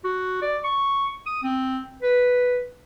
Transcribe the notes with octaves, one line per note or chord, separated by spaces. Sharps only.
F#4
D5
C#6
D#6
C4
B4